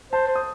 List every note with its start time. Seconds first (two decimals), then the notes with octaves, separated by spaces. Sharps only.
0.12 C5 A5
0.27 C5
0.35 D#6